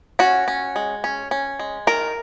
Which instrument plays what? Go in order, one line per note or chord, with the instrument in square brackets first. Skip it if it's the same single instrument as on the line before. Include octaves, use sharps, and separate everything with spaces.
[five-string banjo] C#4 F#4
C#4
G#3
C#4
C#4
G#3
D#3 A#4